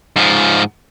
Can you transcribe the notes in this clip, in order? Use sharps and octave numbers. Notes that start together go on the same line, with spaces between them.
G#2 F3